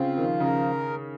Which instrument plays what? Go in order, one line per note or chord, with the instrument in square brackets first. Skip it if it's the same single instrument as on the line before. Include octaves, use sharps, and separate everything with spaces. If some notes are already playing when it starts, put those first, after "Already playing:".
Already playing: [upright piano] C#3 [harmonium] C4 F4
[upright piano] D#3 [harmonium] F3
[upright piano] C#3 [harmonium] A#4